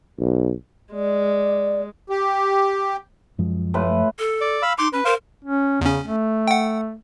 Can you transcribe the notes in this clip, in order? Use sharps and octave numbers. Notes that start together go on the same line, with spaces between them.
B1
G#3 D5
G4
F#2 F3 G#3
A2 F4 B4
A4
D5
F5 B5 E6
D#4 C6 D6
C#4 B4
A#4 C5 F5
C#4
E2 C#3 C#4
A3
F#5 G5